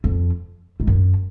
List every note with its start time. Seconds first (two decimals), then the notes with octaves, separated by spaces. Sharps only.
0.04 F2
0.80 G#2
0.87 F#2